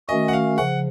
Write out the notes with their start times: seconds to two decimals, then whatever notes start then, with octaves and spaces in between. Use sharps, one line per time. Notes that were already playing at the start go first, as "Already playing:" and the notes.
0.09 D#3 A3 C#4 F#4 D#5
0.28 F#5
0.33 F5
0.58 C#3 F3 F#5